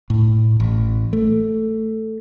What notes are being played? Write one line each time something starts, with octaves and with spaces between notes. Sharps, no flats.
A2
A1
A3